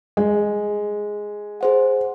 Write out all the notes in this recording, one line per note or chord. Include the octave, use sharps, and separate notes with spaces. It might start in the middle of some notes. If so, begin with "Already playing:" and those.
G#3
G#4 C5 F#5